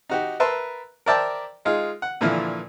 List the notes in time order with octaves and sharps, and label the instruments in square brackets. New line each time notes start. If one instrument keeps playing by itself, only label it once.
[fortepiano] D#4 F#4 G4
A#4 B4 E5 A5 C6
A#4 C5 D5 E5 G5 A5
G#3 D#4 F4 G#4
F#5
A#2 D3 E3 F3 E4 F4